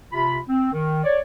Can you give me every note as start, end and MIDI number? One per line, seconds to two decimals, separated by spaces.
0.13 0.38 48
0.13 0.38 65
0.13 0.38 83
0.49 0.70 60
0.73 1.03 51
1.04 1.19 73
1.04 1.19 74